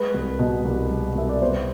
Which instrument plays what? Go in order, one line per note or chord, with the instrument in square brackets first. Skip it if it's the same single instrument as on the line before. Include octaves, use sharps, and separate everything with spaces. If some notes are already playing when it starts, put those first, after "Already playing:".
Already playing: [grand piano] G#3 B4
C2
B2
C2
G#3
C2 E5
D5
B3 C5